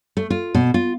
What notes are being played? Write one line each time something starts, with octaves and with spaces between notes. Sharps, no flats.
A3
F4
B2
F4